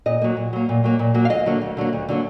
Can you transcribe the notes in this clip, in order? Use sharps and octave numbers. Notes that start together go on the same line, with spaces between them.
A#2 D#5
F#3 A#3
A#2
F#3 A#3
A#2
F#3 A#3
A#2
F#3 A#3
F5
D2 D#5
D3 F#3 A#3
D2
D3 F#3 A#3
D2
D3 F#3 A#3